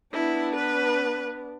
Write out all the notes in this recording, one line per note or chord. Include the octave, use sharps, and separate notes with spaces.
B3 D4 E4
B4